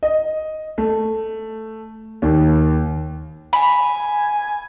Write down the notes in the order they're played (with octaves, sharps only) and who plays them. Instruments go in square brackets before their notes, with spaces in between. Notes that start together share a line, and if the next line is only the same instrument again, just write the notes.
[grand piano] D#5
A3
D#2
[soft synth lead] G#5 [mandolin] B5